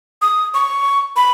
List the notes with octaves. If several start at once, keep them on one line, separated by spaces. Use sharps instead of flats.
D#6
C#6
B5